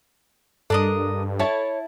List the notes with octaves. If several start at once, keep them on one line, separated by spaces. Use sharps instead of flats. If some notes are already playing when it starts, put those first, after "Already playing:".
G2 D4 A4 A#4 D#5
E4 C#5 A5